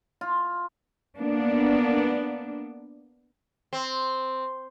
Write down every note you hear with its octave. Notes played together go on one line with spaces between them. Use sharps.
F4
A#3 B3 D4
C4